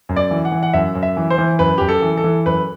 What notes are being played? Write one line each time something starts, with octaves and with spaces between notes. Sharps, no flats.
F#2
D5
E3
F#5
E3
F#5
F#2 E5
F#2
E5
E3
C5
E3
F#2 B4
F#2 G4
A4
E3
A4
E3
F#2 B4